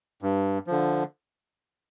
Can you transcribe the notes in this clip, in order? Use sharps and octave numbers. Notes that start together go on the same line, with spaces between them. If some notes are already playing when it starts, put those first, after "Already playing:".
G2
D3 F3